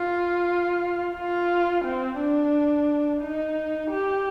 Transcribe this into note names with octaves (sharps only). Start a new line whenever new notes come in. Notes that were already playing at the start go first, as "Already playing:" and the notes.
Already playing: F4
F4
C4
D4
D#4
G4